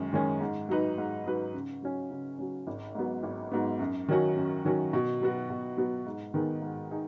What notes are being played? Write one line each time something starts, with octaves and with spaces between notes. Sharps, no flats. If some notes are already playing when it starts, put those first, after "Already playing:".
Already playing: F#2 D#3 G#3 C#4
D#3 G#3 C#4
G#2
F#3 D#4 B4
G#2
F#3 D#4 B4
C#3
F#3 C#4
C#3
F#3 C#4
G#1
G#2 F#3 B3
G#1
G#2 F#3 B3
F#2
D#3 F#3 C#4 F#4
F#2
D#3 F#3 C#4 F#4
B2
F#3 B3 F#4
B2
F#3 B3 F#4
G#2
D#3 B3 D#4 G#4
G#2
D#4 G#4